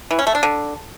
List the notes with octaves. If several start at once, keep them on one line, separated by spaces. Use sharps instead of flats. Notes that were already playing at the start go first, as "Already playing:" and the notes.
E3
C#4
A3
D4
D3